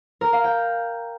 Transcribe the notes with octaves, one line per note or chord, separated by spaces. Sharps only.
A#4
F5
G5